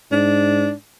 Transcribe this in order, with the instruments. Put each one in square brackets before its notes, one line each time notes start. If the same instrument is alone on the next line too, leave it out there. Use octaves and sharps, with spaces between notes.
[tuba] G#2 [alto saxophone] D4